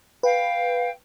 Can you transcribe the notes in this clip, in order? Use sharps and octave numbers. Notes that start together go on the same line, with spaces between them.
B4 F5 G5